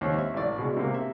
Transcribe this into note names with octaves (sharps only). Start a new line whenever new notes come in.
D#2 C4 C#5
E5
A1 D5
B2 G#3
C3 A#3
E5